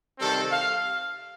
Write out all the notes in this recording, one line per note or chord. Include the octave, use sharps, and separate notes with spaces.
C3 D#3 G3 C4 A4
F5